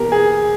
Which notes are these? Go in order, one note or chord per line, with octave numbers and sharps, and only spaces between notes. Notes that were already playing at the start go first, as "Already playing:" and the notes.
Already playing: E2 B2 A#3 G4 A#4
G#4